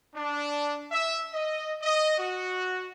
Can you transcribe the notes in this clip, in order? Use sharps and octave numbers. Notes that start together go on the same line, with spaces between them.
D4
E5
D#5
D#5
F#4